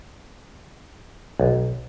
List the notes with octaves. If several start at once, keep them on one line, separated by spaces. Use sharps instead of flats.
B1